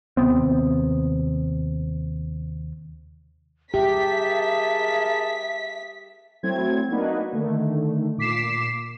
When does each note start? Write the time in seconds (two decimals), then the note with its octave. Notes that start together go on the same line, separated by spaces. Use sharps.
0.17 D#2 C3 B3 C4
3.74 G4 G#4 A#4 E5 A5 B6
6.43 F#3 A3 C4 E4 G#6
6.91 A#3 D4 D#4 F#4 B4
7.33 D3 D#3 A3
8.18 A#2 D6 B6 C7 E7